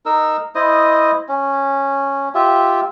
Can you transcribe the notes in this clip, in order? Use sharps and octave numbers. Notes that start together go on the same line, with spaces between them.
D#4 A#4 E6
E4 C5 D#5 D#6
C#4
F4 G4 E5